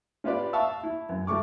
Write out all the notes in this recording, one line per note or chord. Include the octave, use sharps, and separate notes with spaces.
C#4 F4 G4 B4 D5
E5 F5 A5 C#6 E6
E4
F#2
A2 G3 A3 C#6 D6